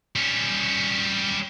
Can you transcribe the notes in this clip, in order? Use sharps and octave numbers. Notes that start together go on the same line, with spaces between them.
G3 C#4